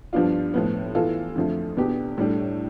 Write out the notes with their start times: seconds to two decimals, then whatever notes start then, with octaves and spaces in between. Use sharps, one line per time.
0.13 G2 F3 B3 D4 F4
0.54 A2 F3 B3
0.95 E3 B3 F4 A4
1.35 F2 D3 F3 A3
1.77 E2 B2 B3 D4 G4
2.18 A2 G3 D4 A4